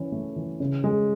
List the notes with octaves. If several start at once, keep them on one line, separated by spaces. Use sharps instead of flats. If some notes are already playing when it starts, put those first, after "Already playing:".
Already playing: E3 C#4
A3
E3
C#3
G#3